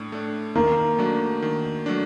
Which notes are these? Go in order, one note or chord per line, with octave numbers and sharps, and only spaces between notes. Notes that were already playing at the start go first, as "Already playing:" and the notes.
Already playing: A2 A3 D4
A3 D4
D#3 A#3
F#3 A3 D4
D#3
F#3 A3 D4